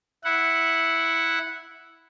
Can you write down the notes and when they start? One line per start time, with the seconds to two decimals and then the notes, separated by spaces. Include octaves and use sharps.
0.24 E4 F#5